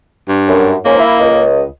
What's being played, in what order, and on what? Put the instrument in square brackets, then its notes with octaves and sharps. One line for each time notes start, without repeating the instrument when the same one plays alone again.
[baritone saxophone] G2
[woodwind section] F#2
[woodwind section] G#2 F3 C#4 [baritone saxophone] A#3
[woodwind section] E4 F5
C#2 D#5